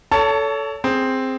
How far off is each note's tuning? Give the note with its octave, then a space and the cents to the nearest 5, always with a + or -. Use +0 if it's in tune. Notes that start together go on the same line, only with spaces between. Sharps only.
A4 +0 C#5 +30 A5 +25
C4 +0 G#4 +0